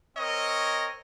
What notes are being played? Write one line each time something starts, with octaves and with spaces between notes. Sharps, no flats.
C4 A#4 C#5 D#5